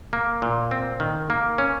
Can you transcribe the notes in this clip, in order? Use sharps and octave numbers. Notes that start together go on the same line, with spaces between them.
A#3
A#2
C4
D#3
A#3
C#4